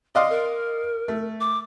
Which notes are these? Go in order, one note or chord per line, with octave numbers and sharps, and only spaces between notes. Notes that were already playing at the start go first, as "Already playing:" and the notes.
D5 D#5 F5 C6
A#4
A3
D6